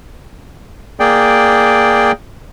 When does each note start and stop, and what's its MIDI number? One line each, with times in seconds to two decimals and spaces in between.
1.00 2.12 58
1.00 2.12 68
1.00 2.12 74
1.00 2.12 79